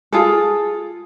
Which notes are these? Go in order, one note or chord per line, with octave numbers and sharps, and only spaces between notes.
F4 G#4 A4